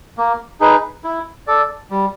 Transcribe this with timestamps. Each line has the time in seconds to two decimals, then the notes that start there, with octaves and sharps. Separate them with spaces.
0.18 A#3
0.60 D#4 G#4 B4
1.04 E4
1.47 A4 D5
1.90 G3